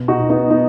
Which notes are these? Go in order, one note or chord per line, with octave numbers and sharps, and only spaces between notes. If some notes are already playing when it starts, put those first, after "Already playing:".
Already playing: B2
D#4 F#4
B2
B3 D#4
B3 D#4